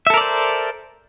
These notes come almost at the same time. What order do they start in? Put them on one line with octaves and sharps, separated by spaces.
E5 A4 A#4 D5 C5